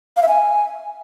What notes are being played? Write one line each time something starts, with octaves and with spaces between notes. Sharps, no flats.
F5
E5
G#5